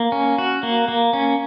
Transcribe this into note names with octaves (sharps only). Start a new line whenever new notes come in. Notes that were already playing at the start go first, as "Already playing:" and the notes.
Already playing: A#3
C#4
F#4
A#3
A#3
C#4